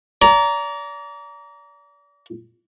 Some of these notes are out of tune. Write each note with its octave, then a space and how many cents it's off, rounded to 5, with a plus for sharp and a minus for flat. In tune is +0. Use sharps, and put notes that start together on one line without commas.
D5 -35 A#5 +0